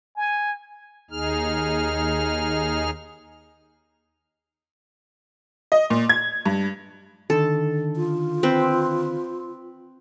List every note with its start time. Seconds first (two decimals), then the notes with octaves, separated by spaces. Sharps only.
0.16 G#5
1.11 D#2 D#4 G#4 F6
5.72 D#5
5.90 A#2
6.09 G#6
6.46 G2
7.30 D3 D#3 A4
7.96 F4
8.43 C4 B4